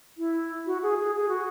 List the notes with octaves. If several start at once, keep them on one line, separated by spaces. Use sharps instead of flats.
E4
F#4
G#4
G#4
G#4
F#4